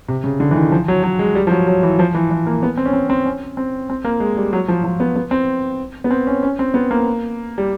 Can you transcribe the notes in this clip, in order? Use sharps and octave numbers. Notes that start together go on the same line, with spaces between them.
C3
C#3
D3
E3
D#3
F3
F#3
F#3
G#3
G3
F3
F#3
F#3
E3
F3
E3
E3
A#3
B3
C4
C#4
C4
C4
C#4
C4
C4
A#3
G#3
G3
F#3
F3
F3
B3
B3
C4
B3
C4
C#4
C#4
C4
B3
A#3
G3